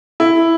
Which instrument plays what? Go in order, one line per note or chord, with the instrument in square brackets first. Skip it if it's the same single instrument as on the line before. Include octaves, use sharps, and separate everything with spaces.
[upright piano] E4